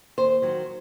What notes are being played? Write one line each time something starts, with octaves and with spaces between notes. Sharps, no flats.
D#2 C5
D#3 F#3